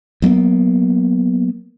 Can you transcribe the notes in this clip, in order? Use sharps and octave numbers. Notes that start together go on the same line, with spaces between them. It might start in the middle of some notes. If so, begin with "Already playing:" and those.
D2 F#3 A#3 B3